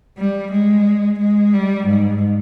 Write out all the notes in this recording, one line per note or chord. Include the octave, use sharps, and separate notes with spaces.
G3
G#3
G#3
G3
G#2